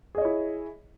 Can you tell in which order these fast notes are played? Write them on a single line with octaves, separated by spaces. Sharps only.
G#4 D#5 C#5 E4